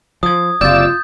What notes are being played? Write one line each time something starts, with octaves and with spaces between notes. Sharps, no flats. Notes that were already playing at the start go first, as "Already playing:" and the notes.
F3 D#6 G#6
F#1 C3 F4 D5 E6 G6 A6